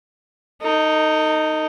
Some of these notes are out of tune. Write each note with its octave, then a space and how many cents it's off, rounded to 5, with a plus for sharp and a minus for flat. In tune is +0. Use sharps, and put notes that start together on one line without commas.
D#4 +0 A4 +45